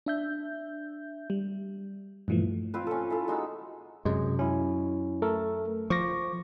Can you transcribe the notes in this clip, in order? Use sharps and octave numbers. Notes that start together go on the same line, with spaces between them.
D4 E5 G6
G3
G2 A#2 E3 F3 A3
C4 F4 B4
C#4 A4
E4 F4 A4
G#3 D#4 F#4 E6
F#2 C3 G#3
C#4 E4
A3 A4 A#4
F3 C#6 D6 A#6